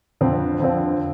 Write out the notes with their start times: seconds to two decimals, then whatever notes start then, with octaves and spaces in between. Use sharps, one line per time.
0.21 F2 D3 F3 C4
0.60 F2 D3 F3 C4